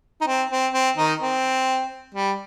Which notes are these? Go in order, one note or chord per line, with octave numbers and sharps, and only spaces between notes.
D#4
C4
C4
C4
D#3 D#4
C4
G3